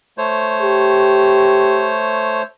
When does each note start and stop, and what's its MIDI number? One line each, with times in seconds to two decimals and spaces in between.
0.18 2.42 57
0.18 2.42 72
0.18 2.42 73
0.62 1.94 67